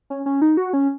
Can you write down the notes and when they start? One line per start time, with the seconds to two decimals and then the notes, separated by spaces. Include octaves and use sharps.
0.10 C#4
0.26 C#4
0.42 D#4
0.57 F#4
0.73 C#4